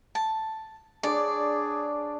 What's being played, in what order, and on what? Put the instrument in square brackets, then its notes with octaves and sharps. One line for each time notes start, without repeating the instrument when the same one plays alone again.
[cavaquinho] A5
[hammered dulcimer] D4 C#5 [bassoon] G#4 [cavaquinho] D5